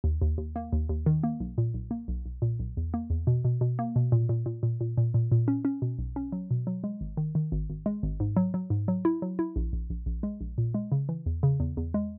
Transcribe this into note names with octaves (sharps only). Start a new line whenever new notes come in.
D#2
D#2
D#2
A#3
D#2
D#2
D#3
A#3
B1
A#2
B1
A#3
B1
B1
A#2
B1
E2
A#3
E2
B2
B2
B2
A#3
B2
A#2
A#2
A#2
A#2
A#2
A#2
A#2
A#2
C#4
C#4
B2
B1
C#4
F#3
B2
F#3
G#3
G#1
D#3
D#3
G#1
G#1
G#3
G#1
G#2
F#3
F#3
G#2
F#3
E4
F#3
E4
A#1
A#1
A#1
A#1
G#3
A#1
A#2
G#3
C#3
E3
E2
C#3
E2
E2
G#3